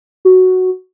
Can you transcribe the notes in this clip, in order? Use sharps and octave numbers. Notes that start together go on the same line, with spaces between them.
F#4